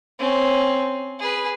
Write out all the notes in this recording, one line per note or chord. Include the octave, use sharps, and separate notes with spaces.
C4 C#4
G#4 B4